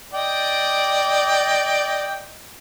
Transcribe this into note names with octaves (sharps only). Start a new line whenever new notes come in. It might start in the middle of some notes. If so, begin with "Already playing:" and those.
D5 D#5 G5